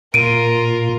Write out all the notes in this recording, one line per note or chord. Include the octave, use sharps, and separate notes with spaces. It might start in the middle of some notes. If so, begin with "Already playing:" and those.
A#2 F4 A#4 D7 D#7